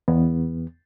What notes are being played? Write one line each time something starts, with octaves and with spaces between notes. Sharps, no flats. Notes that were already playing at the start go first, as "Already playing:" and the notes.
E2 B3